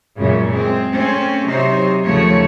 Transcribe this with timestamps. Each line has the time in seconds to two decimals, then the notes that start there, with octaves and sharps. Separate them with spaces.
0.18 F#2 A#2 C#3 G#3
0.48 G#3 C4
0.92 A3 C4 C#4
1.46 C3 F#3 D#4 C5
2.03 D#2 C#3 F3 A3 C#5